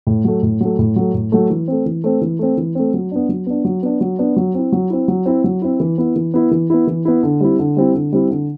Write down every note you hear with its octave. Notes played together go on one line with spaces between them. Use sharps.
A2
F#3 A3
A2
F#3 A3
A2
F#3 A3
A2
F#3 A3
E3
A3 C4
E3
A3 C4
E3
A3 C4
E3
A3 C4
F#3
B3 D4
F#3
B3 D4
F#3
B3 D4
F#3
B3 D4
F#3
C4 E4
F#3
C4 E4
F#3
C4 E4
F#3
C4 E4
E3
B3 E4
E3
B3 E4
E3
B3 E4
E3
B3 E4
D3
G3 C4 E4
D3
G3 C4 E4
D3
G3 C4 E4
D3